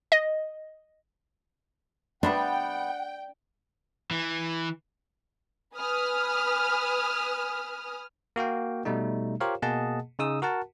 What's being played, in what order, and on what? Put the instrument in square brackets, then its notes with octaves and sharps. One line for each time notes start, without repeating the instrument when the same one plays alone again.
[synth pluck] D#5
[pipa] C3 G3 B3 [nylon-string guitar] D4 [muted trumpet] F#5 [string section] G5
[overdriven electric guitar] E3
[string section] B4 G#5 D#6 F6
[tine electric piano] A#3 F#4 F5 G5
B2 G3 A3 D#4
F4 G4 A#4 C5 C#5 F5
B2 A#3 G#4 D#5 F#5 A5
C#3 D#4 G#4 D#6 E6
F#4 A#4 F#5 A5